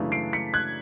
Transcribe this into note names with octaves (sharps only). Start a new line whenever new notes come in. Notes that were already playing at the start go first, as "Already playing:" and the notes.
Already playing: F#2 C#3 E3 A3 D4
C7 D7
B6 C#7
F#6 G#6